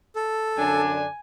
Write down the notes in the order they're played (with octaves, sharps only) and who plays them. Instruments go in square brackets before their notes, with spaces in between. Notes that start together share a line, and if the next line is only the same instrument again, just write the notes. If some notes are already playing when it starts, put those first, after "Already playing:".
[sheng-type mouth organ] A4
[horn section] F#2 D3 D4 [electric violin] G#5